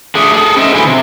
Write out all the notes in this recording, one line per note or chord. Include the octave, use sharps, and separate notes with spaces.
A3 D4 G#4
G#4 A4
C#4 G#4 C5 D#5 E5
D3 E3 F#3 C4 E4 G#4
C3